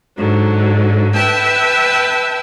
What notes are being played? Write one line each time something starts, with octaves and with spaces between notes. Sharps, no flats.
G#2 D3 F#3
B4 E5 G5 A5